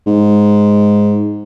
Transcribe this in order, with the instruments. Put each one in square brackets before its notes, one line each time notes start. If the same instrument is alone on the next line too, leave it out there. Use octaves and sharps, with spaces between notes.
[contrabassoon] G#2